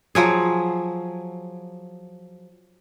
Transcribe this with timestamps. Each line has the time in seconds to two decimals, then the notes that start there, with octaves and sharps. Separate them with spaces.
0.15 F3 F#3 G#4